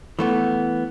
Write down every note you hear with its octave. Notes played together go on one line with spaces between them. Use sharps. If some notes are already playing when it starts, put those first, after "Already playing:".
E3 A3 B3